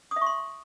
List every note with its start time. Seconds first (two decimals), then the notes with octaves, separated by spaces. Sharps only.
0.11 D#6
0.16 E5
0.21 C#6
0.26 C6